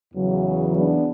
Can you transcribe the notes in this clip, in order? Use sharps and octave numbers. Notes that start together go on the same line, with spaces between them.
E2 C#3 E3 F#3
B3 D4